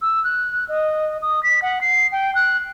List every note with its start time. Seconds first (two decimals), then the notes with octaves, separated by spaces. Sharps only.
0.02 E6
0.24 F#6
0.69 D#5
1.22 D#6
1.43 B6
1.62 F#5
1.81 C7
2.12 G5
2.35 F#6